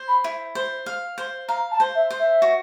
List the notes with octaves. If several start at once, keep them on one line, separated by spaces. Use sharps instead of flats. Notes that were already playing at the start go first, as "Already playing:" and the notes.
Already playing: C5
B5
E4
C5
F5
C5
F5 A#5
A5
C5
E5
C5
E5
F#4